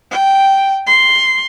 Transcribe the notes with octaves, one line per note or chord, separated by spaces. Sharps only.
G5
C6